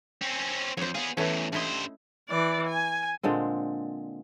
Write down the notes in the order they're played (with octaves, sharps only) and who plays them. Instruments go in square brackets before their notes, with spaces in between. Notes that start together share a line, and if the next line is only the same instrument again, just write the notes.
[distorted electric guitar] C4 C#4
[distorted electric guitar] F2 [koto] C5 C#5
[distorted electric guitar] B3 G#4 [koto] F5
[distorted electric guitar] E2 A2 [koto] E3 A3 C#4
[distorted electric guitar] G2 C5 [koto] A3 E4 D#5
[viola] E3 D5
G#5
[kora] A#2 D3 G#3 C4